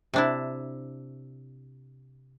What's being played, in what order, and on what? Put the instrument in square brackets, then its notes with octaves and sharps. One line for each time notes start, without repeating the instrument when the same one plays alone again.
[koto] C3 D4 E4